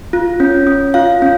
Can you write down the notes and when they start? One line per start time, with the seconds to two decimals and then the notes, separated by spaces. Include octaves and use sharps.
0.13 F4
0.40 C#4
0.67 C#4
0.94 F4 F5
1.22 C#4